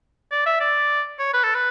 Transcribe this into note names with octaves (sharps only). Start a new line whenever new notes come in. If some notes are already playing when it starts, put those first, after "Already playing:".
D5
E5
D5
C#5
B4
A4
B4